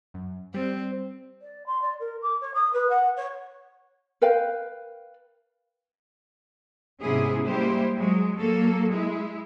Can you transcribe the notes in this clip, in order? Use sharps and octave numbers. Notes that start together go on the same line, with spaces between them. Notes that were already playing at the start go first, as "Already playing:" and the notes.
F#2
G3 C4
D5
C6
D5
A#4
D6
C#5
D#6
B4
F#5
C#5
A#4 B4 F5 G5
G#2 C3 B3 C#4 E4 G#4
G3 G#3 A#3 E4 G4 C5
F#3 G#3
F#3 A#3 A4
G#3 E4